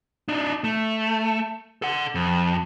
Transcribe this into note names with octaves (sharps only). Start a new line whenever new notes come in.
D4 D#4
A3
A4 F#5
F2